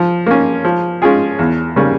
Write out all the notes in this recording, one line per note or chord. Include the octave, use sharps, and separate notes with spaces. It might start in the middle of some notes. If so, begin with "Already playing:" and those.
Already playing: F3
A#3 C#4
F3
G#3 C#4 F4 G#4
E2
C#3 G3 A#3 C#4